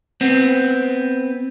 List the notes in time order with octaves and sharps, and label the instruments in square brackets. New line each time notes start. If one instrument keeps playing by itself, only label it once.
[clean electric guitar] B3 C4